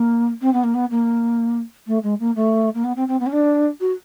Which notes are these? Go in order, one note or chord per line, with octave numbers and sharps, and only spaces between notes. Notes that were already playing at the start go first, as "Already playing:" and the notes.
Already playing: A#3
C4
B3
A#3
B3
A#3
A3
G#3
A#3
A3
A#3
B3
C4
C4
B3
C#4
D4
F#4